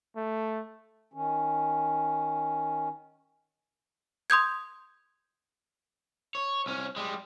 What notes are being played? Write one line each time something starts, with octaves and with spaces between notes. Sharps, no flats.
A3
D#3 C#4
C6 D#6 G6 G#6
C#5
C2 C#4
G3 G#3